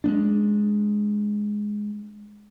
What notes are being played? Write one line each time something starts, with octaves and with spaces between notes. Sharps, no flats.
G#3 B3 D4